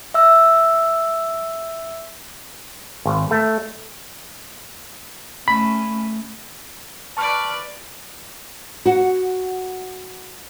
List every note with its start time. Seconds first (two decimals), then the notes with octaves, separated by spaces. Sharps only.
0.14 E5 E6
3.05 G#1
3.31 A3
5.48 A3 C#4 B5
7.17 B4 D5 A5 C#6 F6
8.86 F#4 F#5